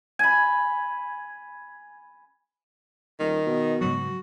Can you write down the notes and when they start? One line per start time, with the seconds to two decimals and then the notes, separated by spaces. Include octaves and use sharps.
0.19 G#5 B5
3.20 D#1 D#3
3.47 B2
3.81 G#2 C#3 F#3 F#4